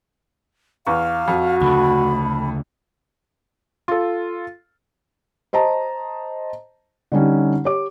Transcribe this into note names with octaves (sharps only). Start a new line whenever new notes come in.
E2 B4 F5 C#6
F2 F#4
D2 C#3 A3 B5
F4 A4
C5 D#5 A5 A#5
D3 G3 C#4 D#4
G4 C#5 D6